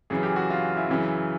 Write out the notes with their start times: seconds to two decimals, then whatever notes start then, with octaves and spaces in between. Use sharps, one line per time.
0.10 F#2 C#3 E3 G#4
0.23 G4
0.36 F#4
0.50 F4
0.77 E4
0.89 F#2 C#3 E3